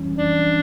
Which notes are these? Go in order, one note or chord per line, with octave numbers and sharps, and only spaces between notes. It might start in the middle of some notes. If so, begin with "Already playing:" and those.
Already playing: F2 E3 G3 C#4
F2 D4